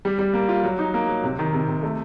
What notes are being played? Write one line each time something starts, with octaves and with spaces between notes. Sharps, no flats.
G3
G3
A#3
F4
F#3
D#4
A#3
F#3
C3
D#3
C3
C3
A3